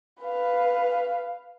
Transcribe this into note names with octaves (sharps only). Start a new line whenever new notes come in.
B4 F5